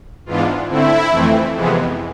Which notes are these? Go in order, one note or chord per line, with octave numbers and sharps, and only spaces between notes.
G#2 E3 B3 D4 F4
D3 A3 C4 E4
F2 E3 A3 C4
F2 C3 E3 G#3 B3